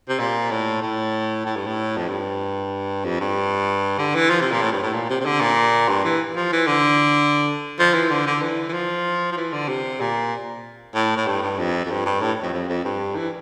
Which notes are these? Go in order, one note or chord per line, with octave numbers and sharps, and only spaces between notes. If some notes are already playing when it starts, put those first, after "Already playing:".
C3
A#2
A2
A2
A2
G2
A2
F2
G2
F2
G2
D3
E3
F3
C3
A#2
A2
G2
A2
A#2
C3
C3
D3
A#2
G2
E3
F3
E3
D3
F3
E3
D3
D3
E3
E3
F3
F3
E3
D3
C3
A#2
A2
A2
G2
G2
F2
F2
G2
G2
A2
F2
F2
F2
G2
E3